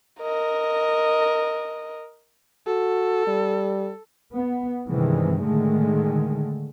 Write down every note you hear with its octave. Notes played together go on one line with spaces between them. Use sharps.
A#4 D#5
F#4 A4
G3
B3
G2 C3 D#3 E3 G#3
A2 D3 D#3 G#3 A3